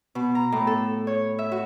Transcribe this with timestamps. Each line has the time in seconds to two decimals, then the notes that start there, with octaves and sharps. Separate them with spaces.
0.15 B2
0.35 A#5
0.52 A2
0.67 A4
1.07 C#5
1.39 E5
1.52 F#4